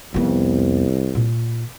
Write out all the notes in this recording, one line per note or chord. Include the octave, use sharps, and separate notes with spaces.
C2 F2 B3
A#2